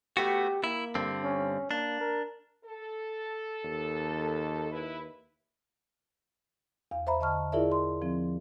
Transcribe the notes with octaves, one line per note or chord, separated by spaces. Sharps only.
A3 B3 F#4 G4
A#3 E4
G2 D3 C4
C#4
A#3 D4
A#4
A4
D#2
E4 B4
E2 F5
C5 E5 A#5 B5
D3 D#5 A5 C#6 F6
E4 F4 G#4 A#4 D5 E5
C6
F3 C4